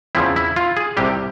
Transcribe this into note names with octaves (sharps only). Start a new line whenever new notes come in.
E2 C#3 F3 C4 E4
E4
F4
G#4
C2 C3 G3 G4